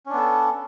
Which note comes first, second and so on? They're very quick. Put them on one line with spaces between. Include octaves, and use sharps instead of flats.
C#4 D4 B3 A4